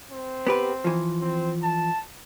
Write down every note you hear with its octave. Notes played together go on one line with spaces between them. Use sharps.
C4
B3 G4 B4
E3 F3
C4
A5